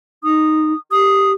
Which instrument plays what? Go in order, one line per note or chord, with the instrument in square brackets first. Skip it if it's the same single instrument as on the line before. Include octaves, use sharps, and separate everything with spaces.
[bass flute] D#4 [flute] D#6
[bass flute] G4 [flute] D#6